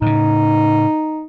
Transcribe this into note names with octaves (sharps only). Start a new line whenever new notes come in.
A2 C#3 D#4